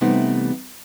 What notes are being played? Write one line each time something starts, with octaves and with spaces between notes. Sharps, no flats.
C3 E3 G3 A3 B3 D#4